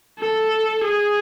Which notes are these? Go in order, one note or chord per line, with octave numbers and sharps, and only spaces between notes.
A4
G#4